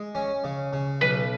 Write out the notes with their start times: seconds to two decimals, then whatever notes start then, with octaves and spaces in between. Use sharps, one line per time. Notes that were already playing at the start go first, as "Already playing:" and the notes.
Already playing: G#3
0.15 C#4
0.44 C#3
0.73 C#3
1.01 B1 B4